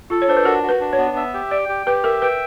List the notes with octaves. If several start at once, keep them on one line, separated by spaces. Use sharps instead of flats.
F4 A4
C#5
D4 C5
B4
F#4 A#4
F#4
B4
D4
C#5
B3
E5
G4
D5 G5
G4
G4 B4
A#4 E5
B4 G5